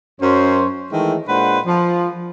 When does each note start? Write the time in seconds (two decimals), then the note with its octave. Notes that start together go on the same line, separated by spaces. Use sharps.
0.20 F#2 C#4 C5
0.92 D#3 E3 G#3 A3
1.27 A#2 G#3 D4 B4 C5 F#5
1.65 F3